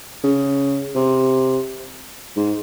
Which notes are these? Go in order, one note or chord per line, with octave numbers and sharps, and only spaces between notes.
C#3
C3
G#2